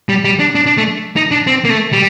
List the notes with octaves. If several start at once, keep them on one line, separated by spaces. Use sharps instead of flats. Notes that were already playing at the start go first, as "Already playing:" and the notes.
G3
G3
D4
D4
D4
A3
D#4
D4
C4
A#3
A3
G3